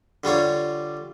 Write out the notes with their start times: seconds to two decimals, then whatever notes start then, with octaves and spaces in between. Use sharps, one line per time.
0.24 D3 G3 F4 C#5